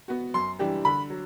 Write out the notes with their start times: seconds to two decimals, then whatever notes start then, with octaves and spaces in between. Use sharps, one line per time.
0.08 B3 F#4
0.34 F#2 C6
0.59 E3 G3 D4 G4
0.85 D3 B5
1.10 F#3